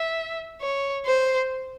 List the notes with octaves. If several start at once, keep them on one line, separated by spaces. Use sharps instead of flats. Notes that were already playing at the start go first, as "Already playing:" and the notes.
Already playing: E5
C#5
C5